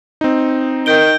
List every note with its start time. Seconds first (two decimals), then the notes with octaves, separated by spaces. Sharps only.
0.21 C4 D#4
0.86 D#3 G6 D7 G7